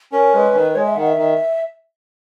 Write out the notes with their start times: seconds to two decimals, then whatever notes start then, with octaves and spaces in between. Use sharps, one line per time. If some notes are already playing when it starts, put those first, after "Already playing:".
0.12 C#4 A#4
0.34 G#3 B4
0.55 D#3
0.75 G#3 C#5
0.85 E5
0.96 D#3 F#5
1.07 E5
1.16 D#3